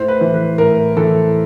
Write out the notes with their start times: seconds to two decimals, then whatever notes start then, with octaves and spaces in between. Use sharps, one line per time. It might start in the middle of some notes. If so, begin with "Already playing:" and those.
Already playing: A2 C5
0.08 B4
0.21 E3
0.34 B4
0.58 A2 A#4
0.97 E3 A4